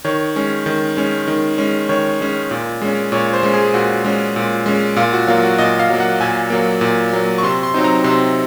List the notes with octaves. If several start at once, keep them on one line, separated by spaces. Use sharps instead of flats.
D#3 C#5
G#3 C#4
D#3
G#3 C#4
D#3
G#3 C#4
D#3 C#5
G#3 C#4
A#2
G#3 C#4
A#2 C#5
C5
G#3 C#4
G#4
A#2 F#4
G#3 C#4
A#2
G#3 C#4
A#2 F4
F#4
F#3 A#3 F4
F#4
A#2 D#5
F5
F#3 A#3
F#5
A#2 G#5
F#3 A#3
A#2
F#3 A#3
C#6
C3 C6
C6
F#3 C4 D#4
A#5
C3 C6